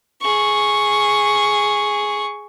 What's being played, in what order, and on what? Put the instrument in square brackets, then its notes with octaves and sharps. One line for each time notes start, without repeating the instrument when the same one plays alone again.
[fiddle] G#4 C#6